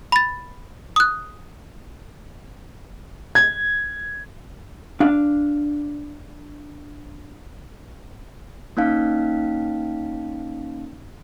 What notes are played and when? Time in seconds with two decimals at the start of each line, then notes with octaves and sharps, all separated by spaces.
0.12 B5 A6
0.96 D#6 F#6
3.35 G#6
5.00 D4 F5
8.77 A#3 C#4 D#4 F5